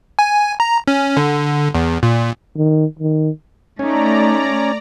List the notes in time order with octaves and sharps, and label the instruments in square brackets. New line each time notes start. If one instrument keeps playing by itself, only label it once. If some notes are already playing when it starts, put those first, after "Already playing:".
[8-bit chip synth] G#5
A#5
C#4
D3
E2
A#2
[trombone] D#3
D#3
[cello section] A3 [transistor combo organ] C#4 [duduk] D#4 [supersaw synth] D5 A#5